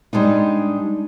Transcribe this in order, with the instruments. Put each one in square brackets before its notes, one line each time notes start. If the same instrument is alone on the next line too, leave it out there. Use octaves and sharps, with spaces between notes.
[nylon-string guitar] G3 G#3 D4 D#4